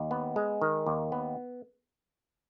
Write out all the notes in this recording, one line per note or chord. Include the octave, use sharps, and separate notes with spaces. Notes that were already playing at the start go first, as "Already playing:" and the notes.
Already playing: D#2
B3
G#3
D#3
D#2
B3